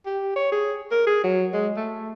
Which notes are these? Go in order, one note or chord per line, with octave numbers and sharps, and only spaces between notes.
G4
C#5
G#4
A#4
G#4
F#3
G#3
A3